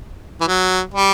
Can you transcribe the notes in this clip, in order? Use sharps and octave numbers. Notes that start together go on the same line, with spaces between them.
E3
F#3
G3